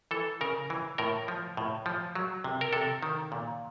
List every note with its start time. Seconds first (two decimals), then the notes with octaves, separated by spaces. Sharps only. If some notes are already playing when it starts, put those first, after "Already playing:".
0.11 E3 A4
0.41 C#3 A#4
0.70 E3
0.98 A2 A#4
1.28 F3
1.57 A2
1.86 F3
2.15 F#3
2.44 C3
2.61 A#4
2.73 C3 A4
3.03 D#3
3.32 A#2